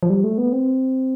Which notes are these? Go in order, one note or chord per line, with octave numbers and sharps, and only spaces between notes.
F3
G3
A3
B3
C4